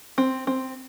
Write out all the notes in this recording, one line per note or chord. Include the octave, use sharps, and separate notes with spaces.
C4
C4